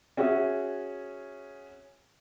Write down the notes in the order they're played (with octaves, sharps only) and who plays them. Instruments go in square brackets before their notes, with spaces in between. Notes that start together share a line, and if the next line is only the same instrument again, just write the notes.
[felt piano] C#4 F#4 G#4 E5